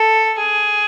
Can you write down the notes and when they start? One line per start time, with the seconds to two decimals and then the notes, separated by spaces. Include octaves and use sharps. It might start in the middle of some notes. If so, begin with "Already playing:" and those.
Already playing: A4
0.38 G#4